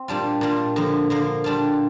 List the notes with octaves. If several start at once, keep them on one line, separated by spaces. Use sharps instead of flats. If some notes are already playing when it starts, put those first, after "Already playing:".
Already playing: C4
A#2 G3 D4 F4
A#2 G3 D4 F4
D3 F3 A#3
D3 F3 A#3
G3 D4 F4